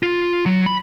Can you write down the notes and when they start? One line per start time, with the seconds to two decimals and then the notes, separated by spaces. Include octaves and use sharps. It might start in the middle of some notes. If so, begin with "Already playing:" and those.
0.03 F4
0.46 F#3
0.66 B5